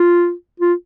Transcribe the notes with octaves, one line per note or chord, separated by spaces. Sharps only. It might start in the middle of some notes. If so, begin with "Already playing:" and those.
Already playing: F4
F4